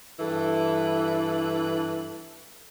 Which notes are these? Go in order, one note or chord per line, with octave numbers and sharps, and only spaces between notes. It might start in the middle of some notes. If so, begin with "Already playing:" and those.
G2 E3 A4